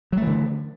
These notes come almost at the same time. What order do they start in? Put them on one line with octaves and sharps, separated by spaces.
F#3 A3 E3 D3